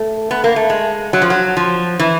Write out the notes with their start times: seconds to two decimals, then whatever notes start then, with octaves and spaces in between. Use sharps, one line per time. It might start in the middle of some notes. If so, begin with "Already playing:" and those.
Already playing: A3
0.31 B3
0.44 A#3
0.56 A3
0.70 G#3
1.13 F#3
1.22 F3
1.30 F#3
1.57 F3
1.99 E3